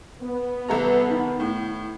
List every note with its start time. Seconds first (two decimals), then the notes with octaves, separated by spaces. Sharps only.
0.22 B3
0.68 C2 A4 A#5
1.10 D#3
1.40 A2